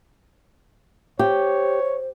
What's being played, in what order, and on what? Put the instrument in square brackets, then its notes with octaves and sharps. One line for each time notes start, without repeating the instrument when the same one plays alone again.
[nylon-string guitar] G4 [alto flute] C5 [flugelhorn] C#5